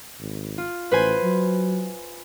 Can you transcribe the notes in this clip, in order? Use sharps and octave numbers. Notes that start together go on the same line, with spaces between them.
G#1
F4
A1 B4 C5 G#5
F#3